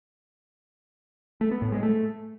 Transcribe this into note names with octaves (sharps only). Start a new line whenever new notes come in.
A3
B3
A2
G#3
A3